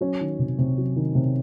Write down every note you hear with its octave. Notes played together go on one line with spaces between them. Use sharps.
F#3 C#4
D#3
C3
C3
F#3
D#3
C3